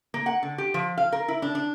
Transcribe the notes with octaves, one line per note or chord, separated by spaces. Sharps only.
A#3
F#5
D3
G4
F3
F5
A#4
E4
D4
D4